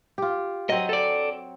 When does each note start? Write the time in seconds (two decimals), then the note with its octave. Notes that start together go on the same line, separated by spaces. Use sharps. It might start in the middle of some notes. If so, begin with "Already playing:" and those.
0.18 F4 G4
0.69 F#3 C4 D#5
0.89 A4 D5